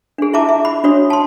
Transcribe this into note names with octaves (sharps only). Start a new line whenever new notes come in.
D4 G#4
E4 F4 E5 A5 A#5 D6
E5
B5
D4 F#4 C#5 D#6
A5 C6